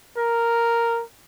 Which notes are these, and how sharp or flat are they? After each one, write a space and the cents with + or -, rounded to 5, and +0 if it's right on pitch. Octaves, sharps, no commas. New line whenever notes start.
A#4 -5